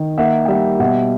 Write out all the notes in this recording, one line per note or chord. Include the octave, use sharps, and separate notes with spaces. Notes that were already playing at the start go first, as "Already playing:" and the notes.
Already playing: D#3
A#3 E5 F#5
G5
G3 E5 F#5
B2 E5 F#5